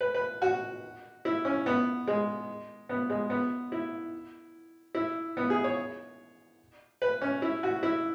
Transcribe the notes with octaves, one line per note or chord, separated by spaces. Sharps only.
B4
B4
F#4
E4
C#4
B3
G#3
B3
G#3
B3
E4
E4
B3
G#4
C#5
B4
C#4
E4
F#4
E4